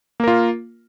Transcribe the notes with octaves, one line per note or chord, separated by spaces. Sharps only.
A#3 F4 A#4